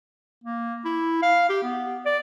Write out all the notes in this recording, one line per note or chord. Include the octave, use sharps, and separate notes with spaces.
A#3
E4
F5
G4
B3
D5